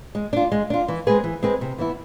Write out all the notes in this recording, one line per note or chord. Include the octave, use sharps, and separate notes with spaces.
G#3
D4 F4
G#3
D4 F4
E3
G#3 C4 G#4 B4
E3
G#3 C4 G#4 B4
C3
E3 B3 E4